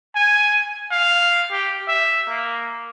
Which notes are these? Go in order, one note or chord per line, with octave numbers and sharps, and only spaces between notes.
G#5
F5
G4
E5
A#3